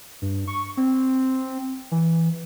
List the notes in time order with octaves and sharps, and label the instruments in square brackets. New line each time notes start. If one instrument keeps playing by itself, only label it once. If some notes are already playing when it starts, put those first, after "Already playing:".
[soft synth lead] G2
C#6
C4
E3